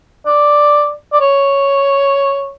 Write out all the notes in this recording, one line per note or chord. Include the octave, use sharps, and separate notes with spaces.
D5
D5
C#5